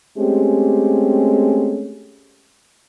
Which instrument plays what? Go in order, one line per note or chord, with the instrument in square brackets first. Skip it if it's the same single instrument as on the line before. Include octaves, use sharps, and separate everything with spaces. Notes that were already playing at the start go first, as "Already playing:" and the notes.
[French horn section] G#3 A3 C4 C#4 G4